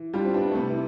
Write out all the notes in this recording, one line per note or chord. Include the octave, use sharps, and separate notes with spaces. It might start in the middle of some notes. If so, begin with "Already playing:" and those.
Already playing: E3
G3 D4 F4
C4
B3 D4
A3
C3 B3
E4